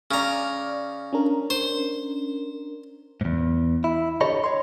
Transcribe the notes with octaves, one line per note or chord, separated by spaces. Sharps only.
C#3 D5 A#5 F6
C#4 D4 A#4
C5
E2 G#2
E4
D3 G4 A4 C#5 D#5 B5
C#5 C6